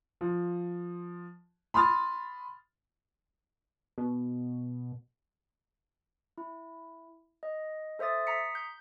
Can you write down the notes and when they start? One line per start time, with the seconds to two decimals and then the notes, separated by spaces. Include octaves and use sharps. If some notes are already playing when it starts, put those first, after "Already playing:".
0.21 F3
1.74 B5 C6 D#6 F6 A6
3.98 B2
6.38 E4
7.43 D#5
7.99 A4 C5 E5 D#6 A6
8.27 A#5 D#6 B6 C#7
8.55 G6